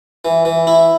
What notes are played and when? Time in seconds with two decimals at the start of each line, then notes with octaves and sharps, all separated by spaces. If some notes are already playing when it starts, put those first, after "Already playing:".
0.25 E3
0.45 E3
0.67 E4